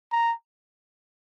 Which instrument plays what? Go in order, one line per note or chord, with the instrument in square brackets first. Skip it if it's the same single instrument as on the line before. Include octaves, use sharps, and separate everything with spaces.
[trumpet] A#5